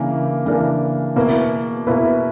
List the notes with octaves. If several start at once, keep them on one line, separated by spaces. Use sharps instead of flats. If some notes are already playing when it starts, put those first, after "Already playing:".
Already playing: C#3 E3 A#3 D4 A#4
C#3 E3 A#3 D4 A#4
B2 A#3 E4 B4
B2 A#3 E4 B4